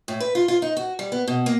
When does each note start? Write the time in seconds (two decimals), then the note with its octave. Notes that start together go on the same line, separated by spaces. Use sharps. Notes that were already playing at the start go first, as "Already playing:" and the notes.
0.08 A2
0.20 B4
0.35 F4
0.48 F4
0.62 D#4
0.77 F#4
0.99 G3
1.12 B3
1.28 B2
1.46 A#3